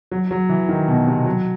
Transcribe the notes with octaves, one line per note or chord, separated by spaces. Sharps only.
F#3
F#3
E3
D#3
B2
C3
F#3